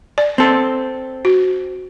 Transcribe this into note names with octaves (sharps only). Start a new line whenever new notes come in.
D5
C4 A4
F#4